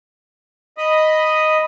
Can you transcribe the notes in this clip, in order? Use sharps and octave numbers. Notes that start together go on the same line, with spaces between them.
D#5 B5 D#6